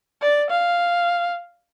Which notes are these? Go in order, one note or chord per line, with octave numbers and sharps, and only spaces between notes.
D5
F5